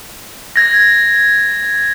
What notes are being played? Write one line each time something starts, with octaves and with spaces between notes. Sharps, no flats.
G#6 A#6